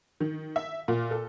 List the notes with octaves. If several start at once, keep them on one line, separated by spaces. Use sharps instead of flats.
D#3
E5
A#2
A4